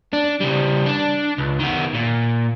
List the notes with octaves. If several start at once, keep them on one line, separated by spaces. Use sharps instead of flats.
D4
C#3 G3
D4
C#2
D#3 B3
A#2